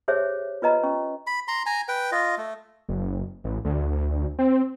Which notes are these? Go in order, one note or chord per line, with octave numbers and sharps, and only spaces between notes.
G4 G#4 C5 C#5 E5
F4 B4 D#5 A#5
C#4 C#6
B5
A#5 C6
G#5 A#5
B4 G5
F4 D#5
A3
F#1
A1
D2
C4